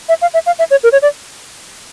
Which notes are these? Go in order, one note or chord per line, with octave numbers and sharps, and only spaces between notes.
E5
F5
E5
F5
E5
C#5
A#4
C#5
D5